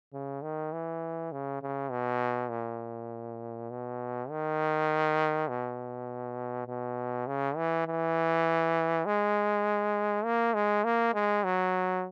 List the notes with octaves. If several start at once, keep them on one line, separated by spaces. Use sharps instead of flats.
C#3
D#3
E3
C#3
C#3
B2
A#2
B2
D#3
B2
B2
C#3
E3
E3
G#3
A#3
G#3
A#3
G#3
F#3